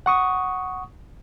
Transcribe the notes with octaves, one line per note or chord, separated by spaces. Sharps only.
F#5 C#6 D#6